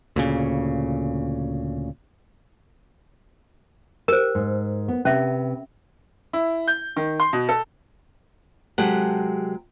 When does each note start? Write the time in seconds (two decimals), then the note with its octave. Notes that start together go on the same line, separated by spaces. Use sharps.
0.16 D2 A#2 C#3
4.08 G4 A#4 C5
4.35 G#2
4.88 B3
5.05 C3 C#4 B4 E5
6.33 E4
6.68 G6
6.96 D#3
7.20 C6
7.33 B2
7.49 A4
8.78 C3 F#3 G#3 G4 A4 F#5